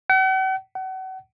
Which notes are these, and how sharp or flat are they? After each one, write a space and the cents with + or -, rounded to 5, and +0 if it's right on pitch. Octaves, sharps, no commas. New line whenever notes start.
F#5 +45
F#5 +35